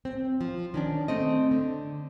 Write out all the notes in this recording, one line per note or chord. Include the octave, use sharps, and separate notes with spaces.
C4
F3
D#3 C#4 D4
A3 C4 D#5
D3